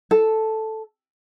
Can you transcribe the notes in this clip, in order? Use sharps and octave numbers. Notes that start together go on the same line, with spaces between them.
A4